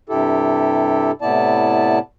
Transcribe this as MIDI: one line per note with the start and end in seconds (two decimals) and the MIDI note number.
0.09 1.12 43
0.09 1.12 48
0.09 1.12 64
0.09 1.12 67
0.09 1.12 69
1.22 1.99 45
1.22 1.99 48
1.22 1.99 59
1.22 1.99 64
1.22 1.99 74
1.22 1.99 81